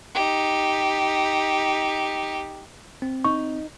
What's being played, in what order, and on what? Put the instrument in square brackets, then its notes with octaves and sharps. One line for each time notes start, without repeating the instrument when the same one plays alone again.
[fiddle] D#4 G4
[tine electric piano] C4
[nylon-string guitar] D#4 [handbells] C#6